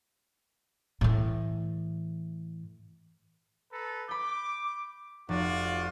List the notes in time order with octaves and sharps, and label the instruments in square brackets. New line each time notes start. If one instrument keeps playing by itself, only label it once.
[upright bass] A2 E3
[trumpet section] A4 B4 A#5
[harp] B5 G6 [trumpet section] D6
[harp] F1 A6 [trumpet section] F4 F#4 D5